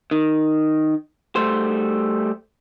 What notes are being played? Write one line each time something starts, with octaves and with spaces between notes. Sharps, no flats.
D#3
G3 A3 C5